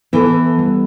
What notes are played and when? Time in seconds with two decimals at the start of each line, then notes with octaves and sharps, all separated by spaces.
0.13 E3 B3 E4 A4
0.59 G3